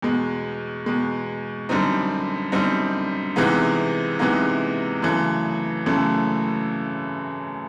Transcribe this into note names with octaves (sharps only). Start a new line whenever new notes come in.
E2 B2 G#3
E2 B2 G#3
F#2 D3 G3 C4 D#4
F#2 D3 G3 C4 D#4
C3 E3 G#3 B3 D#4
C3 E3 G#3 B3 D#4
F#2 C#3 E3 A3
F#2 C#3 E3 A3